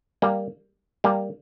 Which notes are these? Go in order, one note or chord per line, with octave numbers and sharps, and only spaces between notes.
G3 A#3
G3 A#3